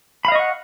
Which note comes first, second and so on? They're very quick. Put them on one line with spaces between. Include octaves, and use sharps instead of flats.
B5 F5 D#5 C#6 F#5